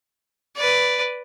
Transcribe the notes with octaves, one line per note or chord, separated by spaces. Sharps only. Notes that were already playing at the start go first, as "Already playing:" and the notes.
B4 D5